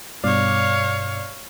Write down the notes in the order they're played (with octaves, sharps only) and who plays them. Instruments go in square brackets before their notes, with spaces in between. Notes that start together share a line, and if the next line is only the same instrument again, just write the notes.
[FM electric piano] G2 B2 D5 [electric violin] C#5 F5